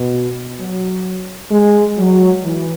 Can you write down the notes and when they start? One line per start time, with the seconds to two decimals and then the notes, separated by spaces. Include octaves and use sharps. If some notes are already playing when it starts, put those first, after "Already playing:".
Already playing: B2
0.59 F#3
1.51 G#3
1.97 F#3
2.44 E3